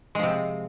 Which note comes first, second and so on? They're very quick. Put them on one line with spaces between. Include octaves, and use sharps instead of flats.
G#3 F3 C3